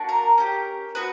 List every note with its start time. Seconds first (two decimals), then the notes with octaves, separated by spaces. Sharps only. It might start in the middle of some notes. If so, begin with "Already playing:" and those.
Already playing: A#3 D4 F#4
0.09 A#4
0.38 C#4 G4
0.95 B3 F#4 B4